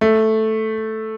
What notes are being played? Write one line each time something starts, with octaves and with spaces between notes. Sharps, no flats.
A3